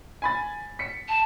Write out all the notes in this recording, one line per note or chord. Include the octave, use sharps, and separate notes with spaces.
G#5 B5 A6
B6 C#7
A5